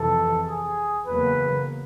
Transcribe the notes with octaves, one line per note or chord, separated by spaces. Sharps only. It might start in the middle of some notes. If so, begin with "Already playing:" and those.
Already playing: F2 C3 E3 A4
G#4
E2 C#3 F#3 A#3 B4